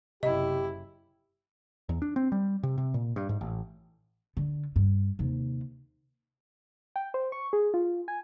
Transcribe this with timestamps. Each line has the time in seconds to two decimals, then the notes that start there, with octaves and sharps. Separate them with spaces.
0.23 F#1 C3 E4 G4 D#5
1.89 E2
2.02 D4
2.16 C4
2.32 G3
2.63 C3
2.78 C3
2.94 A#2
3.16 G2
3.29 G#2
3.41 A1
4.37 D3
4.76 G2
5.19 D#2 C3
6.96 G5
7.14 C5
7.32 C#6
7.53 G#4
7.74 F4
8.08 G#5